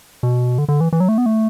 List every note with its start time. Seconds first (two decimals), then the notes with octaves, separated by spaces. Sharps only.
0.23 B2
0.58 D3
0.69 D3
0.81 E3
0.93 E3
1.00 F#3
1.08 A3
1.18 B3
1.26 A3